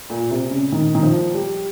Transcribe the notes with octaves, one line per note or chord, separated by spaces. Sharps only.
A#2
C3
C#3
D#3
D#3
F3
G3